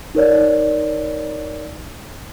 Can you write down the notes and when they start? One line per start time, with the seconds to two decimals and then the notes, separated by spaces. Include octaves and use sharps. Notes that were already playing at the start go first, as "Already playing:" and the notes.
0.15 D#4 A#4 C#5 D5